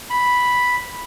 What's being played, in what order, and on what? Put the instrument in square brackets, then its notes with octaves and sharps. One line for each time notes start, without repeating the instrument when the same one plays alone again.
[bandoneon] B5